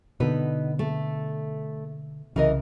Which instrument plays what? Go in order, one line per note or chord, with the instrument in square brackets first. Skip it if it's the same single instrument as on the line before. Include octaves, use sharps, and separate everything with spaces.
[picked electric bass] B2 D3 [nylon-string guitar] B3 D#4 B4
[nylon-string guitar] A3
[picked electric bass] C2 C#3 [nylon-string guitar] E3 A#4 D#5